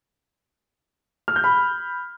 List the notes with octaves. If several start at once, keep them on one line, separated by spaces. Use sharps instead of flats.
F6
G6
B5